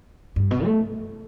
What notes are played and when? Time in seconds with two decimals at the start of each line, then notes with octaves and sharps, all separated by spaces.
0.36 G2
0.51 B2
0.65 A3